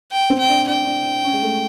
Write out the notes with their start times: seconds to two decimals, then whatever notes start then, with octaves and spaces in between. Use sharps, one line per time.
0.11 G5
0.30 C4
0.39 G5
0.48 D4
0.67 D4 G5
0.86 D4
1.05 D4
1.24 C#4
1.33 G#3
1.42 A3